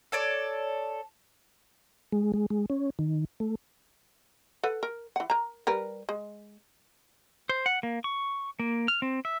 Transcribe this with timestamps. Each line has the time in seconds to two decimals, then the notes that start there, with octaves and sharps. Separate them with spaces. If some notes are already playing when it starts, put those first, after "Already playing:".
0.12 A4 C#5 D5
2.12 G#3
2.34 G#3
2.50 G#3
2.70 C#4
2.99 D#3
3.40 A3
4.63 A4 B4 F#5
4.83 A#4
5.16 E3 F#5
5.30 A#4 A#5
5.67 G3 A#4 B4
6.09 G#3
7.49 C5
7.66 F#5
7.83 A#3
8.04 C#6
8.60 A#3
8.88 F6
9.02 C4
9.25 E5